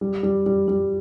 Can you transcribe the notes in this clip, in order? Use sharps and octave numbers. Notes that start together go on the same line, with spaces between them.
G3
G3
G3
G3